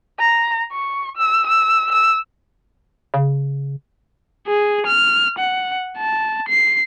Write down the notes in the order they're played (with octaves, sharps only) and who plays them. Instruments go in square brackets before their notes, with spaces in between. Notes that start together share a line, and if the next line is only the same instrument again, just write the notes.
[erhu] A#5
C#6
E6
E6
E6
[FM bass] C#3
[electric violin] G#4
F6
F#5
A5
C7